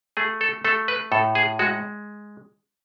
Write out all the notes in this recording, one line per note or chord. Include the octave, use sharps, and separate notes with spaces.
A3 G#4
A4
A3 A4
B4
A2 A4
G#4
G#3 F#4